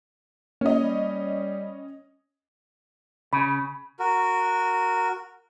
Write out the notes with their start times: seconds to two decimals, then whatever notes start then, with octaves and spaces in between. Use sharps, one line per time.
0.61 A#3 C#4 D#5
0.80 G3
3.33 C#3 B5
3.99 F#4 A#4